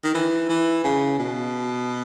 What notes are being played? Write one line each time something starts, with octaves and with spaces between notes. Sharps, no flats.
D#3
E3
E3
C#3
B2